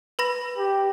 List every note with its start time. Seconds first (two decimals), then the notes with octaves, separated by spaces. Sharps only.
0.19 B4 B5 A#6
0.57 G4